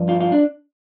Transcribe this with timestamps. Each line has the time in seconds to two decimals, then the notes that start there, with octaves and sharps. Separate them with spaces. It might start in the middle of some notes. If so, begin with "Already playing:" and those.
Already playing: G2 F3
0.09 F4
0.20 F4
0.32 D4